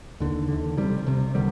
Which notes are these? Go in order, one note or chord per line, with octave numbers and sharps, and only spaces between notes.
D#2 D3
D#2 D3
C2 C3 D#3 G3
C2 C3
D3 D#3 G3